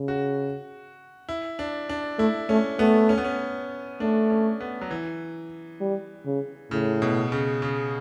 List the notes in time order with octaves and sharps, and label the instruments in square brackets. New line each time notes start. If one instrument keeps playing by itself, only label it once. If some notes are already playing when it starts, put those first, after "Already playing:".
Already playing: [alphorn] C#3
[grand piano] F#4
E4
D4
D4
[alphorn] A3 [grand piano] E4
[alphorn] A3 [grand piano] C#4
[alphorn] A3 [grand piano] B3
[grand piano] C#4
B3
C#4
[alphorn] A3 [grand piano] D4
[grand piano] C#4
B3
F#3
E3
[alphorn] G3
C#3
[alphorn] A2 [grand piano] C#3
[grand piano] B2
C#3
C#3